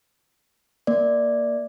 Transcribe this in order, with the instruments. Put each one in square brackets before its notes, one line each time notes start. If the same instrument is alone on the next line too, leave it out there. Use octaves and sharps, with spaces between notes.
[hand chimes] A#3 D5